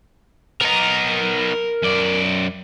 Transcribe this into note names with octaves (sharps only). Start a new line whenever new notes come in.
B3 D#4 A#4 A#5
F#2 D5